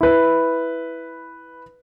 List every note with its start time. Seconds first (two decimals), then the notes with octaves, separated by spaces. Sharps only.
0.01 E4 B4